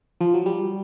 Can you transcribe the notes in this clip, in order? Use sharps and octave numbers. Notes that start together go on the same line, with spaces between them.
F3
F#3
G3